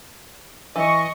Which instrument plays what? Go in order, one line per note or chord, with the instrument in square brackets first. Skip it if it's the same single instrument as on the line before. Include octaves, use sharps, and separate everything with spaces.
[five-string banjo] E3 [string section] D#5 C#6